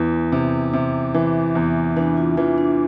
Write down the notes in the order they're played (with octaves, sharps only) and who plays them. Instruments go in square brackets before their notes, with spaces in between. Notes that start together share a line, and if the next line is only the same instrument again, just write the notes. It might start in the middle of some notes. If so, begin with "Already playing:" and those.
Already playing: [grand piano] E2 E3 [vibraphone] E4
[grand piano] C3
C3
E3
E2
[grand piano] E3 [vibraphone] D4
[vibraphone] F4
[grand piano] E3 [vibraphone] F4
[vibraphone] D4